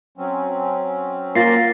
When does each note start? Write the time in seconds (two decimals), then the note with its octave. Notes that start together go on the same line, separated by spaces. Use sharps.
0.18 F#3 C4 C#4
1.35 A#3 F4 A6 A#6 C7